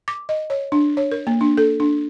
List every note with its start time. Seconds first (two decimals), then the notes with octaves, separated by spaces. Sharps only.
0.08 D6
0.29 D#5
0.50 C#5
0.72 D4
0.97 C#5
1.12 A#4
1.27 A#3
1.41 D4
1.57 A4
1.80 D4